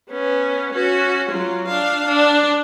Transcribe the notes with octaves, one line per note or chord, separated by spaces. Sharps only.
B3 C#4
C#4 F#4
F#3 F4
D4 F5
D4